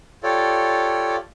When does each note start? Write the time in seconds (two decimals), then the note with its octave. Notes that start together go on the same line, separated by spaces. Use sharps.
0.23 F4 G4 A4 C#5 D5